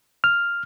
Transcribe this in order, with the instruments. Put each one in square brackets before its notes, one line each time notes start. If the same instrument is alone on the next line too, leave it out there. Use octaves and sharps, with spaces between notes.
[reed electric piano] F6